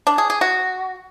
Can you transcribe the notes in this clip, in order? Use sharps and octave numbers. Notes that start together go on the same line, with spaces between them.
D4
G#4
G#4
F#4